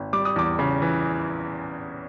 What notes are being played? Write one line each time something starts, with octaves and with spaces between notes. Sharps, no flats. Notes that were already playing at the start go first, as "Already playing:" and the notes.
Already playing: G#1
G3 D6
D#6
E2 D6
C#3
E3